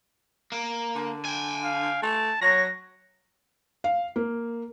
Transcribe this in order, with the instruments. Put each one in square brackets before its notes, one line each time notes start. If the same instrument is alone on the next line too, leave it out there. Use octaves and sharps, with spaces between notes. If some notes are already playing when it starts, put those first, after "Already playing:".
[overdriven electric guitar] A#3
[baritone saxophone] D3
[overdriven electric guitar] G5 G#5
[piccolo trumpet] F5
[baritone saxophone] A3 [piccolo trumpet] A5
[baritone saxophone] F#3 [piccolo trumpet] C#5 [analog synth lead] A#6
[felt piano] F5
A#3